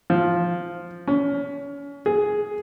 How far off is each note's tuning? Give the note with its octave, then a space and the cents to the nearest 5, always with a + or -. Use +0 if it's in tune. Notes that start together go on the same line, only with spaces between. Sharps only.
F3 +0
C#4 +30
G#4 +5